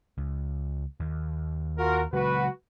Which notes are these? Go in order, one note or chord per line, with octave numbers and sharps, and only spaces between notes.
C#2
D#2
F4 F#4 A#4
C#3 F#3 G#3 F#4 B4